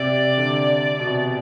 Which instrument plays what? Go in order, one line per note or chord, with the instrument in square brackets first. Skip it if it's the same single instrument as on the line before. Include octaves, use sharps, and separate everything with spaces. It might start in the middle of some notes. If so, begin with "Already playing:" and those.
Already playing: [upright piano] C3 [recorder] D5
[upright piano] D3
B2
C3